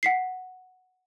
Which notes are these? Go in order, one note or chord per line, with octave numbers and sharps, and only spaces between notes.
F#5 B6 C7